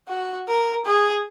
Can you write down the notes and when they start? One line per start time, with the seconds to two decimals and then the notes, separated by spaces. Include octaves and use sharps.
0.08 F#4
0.47 A#4
0.86 G#4